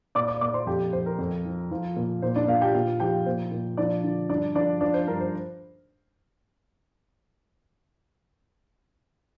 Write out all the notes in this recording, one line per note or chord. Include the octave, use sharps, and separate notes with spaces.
A#2 D5 D6
D5 D6
A#2 D5 D6
C5 C6
F2 G4 G5
F2 C5
A#4
F2
F3
F3
A#2
A#2 C5
D4 D5
A#2 F4 F5
G4 G5
A#2 F4 F5
F3 G4 G5
A#2 C5
A#2
F3 D4 D5
D3
G2 D4 D5
F3 D4 D5
F3 D4 D5
C5
G2 A#4
C5